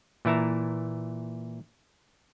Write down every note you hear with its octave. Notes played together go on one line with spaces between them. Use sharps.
A#2 E3 E4 A5 A#5